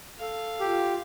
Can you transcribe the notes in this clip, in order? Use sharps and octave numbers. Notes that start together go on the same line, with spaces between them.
A4 F5
F4 G4